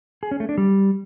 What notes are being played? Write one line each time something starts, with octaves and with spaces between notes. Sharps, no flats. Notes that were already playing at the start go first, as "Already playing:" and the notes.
G#4
C#4
A3
D4
G3